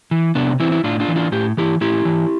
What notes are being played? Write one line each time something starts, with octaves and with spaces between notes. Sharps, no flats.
E3
C3 B3 D4
E3 C4 E4
E4
A2 D4 F4
D4 F4
E3
D4 F4
A2 G4
E3 E4 G4
A2 E4 G4
E3